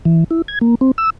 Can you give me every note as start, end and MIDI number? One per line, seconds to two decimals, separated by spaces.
0.05 0.24 52
0.31 0.42 64
0.48 0.59 92
0.61 0.75 58
0.81 0.91 60
0.98 1.10 88